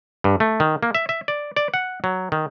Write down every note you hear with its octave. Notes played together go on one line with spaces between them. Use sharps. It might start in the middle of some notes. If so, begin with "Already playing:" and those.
G2
A3
D#3
A#3
E5
E5
D5
D5
F#5
F#3
D#3